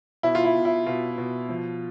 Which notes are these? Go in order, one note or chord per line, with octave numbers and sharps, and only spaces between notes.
B2 E4
F4
E4
B2
E4
B2 F4
B2
F3